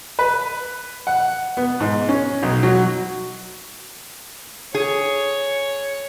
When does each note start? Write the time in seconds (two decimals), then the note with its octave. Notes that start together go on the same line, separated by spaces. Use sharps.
0.19 B4
1.07 F#5
1.57 B3
1.80 G#2
2.09 C#4
2.43 B1
2.63 F#3
4.75 G#4 C#5